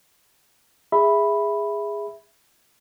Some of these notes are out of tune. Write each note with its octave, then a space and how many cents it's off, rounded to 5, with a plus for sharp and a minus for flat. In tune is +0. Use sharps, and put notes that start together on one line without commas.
G#4 -15 E5 +0 B5 +0